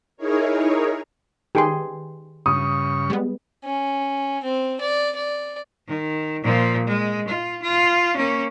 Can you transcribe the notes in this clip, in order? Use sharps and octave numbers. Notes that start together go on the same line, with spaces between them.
D#4 E4 G#4 A#4 C#5
D#3 G4 G#4 B4 C6
G2 C#3 C#6 D#6
G3 G#3 B3
C#4
C4
D5
D5
D#3
A#2 F3
G#3
F4
F4
A#3 C#4